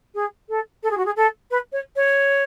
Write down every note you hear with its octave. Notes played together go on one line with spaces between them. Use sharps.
G#4
A4
A4
G#4
F#4
G#4
A4
B4
C#5
C#5